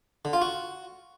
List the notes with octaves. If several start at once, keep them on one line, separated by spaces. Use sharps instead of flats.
D3
F4
F#4